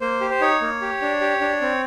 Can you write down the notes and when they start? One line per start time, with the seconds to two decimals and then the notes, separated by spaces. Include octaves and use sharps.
0.01 A#3 C5
0.21 G4
0.30 C5
0.41 D#4 C#5
0.61 A#3
0.81 G4
1.02 D4
1.21 G4
1.41 D4
1.61 C4